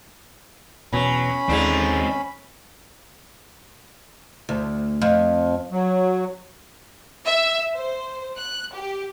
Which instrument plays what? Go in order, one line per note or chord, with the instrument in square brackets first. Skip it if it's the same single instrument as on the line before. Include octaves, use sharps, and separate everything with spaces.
[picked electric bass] E1 B2 [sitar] F#3 [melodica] C#4 B5
[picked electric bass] D#2 G#3 [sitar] D3 F3 D4 [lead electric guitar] C4 D#4
[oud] D2
F2
[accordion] F#3
[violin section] E5
C5
F#6
G4